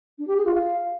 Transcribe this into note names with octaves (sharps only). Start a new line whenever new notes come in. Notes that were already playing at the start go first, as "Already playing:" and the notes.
D4
G4
G#4
F4
F5